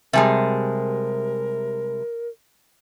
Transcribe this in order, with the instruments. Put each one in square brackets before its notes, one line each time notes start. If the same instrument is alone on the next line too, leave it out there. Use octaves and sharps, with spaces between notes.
[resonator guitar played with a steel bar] C3 G3 G#3 [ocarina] A#4 [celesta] E5 G#5 A5